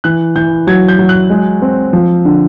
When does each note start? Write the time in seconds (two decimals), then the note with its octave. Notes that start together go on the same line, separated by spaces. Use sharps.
0.04 E3 F#6
0.36 E3 G6
0.67 F#3 G#6
0.88 G6
0.99 F#3
1.09 F#6
1.30 G#3
1.62 C4
1.93 F3
2.25 D3